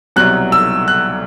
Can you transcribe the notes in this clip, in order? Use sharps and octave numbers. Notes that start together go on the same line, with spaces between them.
C2 B2 F#3 F#6
E6
F#6